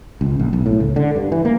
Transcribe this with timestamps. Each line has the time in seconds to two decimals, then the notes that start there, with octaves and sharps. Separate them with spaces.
0.21 C#2
0.39 A#1
0.53 B1
0.66 A2
0.80 C#2
0.96 D3
1.16 G2
1.32 E3
1.45 A#3